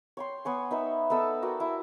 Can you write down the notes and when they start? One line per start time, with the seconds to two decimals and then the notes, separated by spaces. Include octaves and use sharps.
0.17 C#5 G5 C6
0.45 B3 C#5 G#5
0.71 D#4 B4 E5
1.10 B3 D#4 A4 E6
1.42 F#4 A#4 D5 G5
1.60 E4